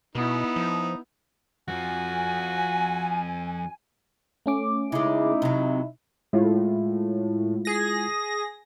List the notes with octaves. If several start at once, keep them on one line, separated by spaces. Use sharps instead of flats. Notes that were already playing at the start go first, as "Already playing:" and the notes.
B2 B3 D#4 E4
F3
F2 F3 F#4 G#5
A3 C#4 D6
C#3 G#3 D#4 E4
C3 F#3
A2 G#3 E4 F4
G#4 A#6